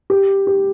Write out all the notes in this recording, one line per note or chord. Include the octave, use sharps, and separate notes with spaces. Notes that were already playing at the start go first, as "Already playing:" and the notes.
G4
G4